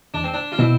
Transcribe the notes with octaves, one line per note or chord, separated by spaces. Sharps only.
E2 D4
C4
D4
F4
B2 C4 E4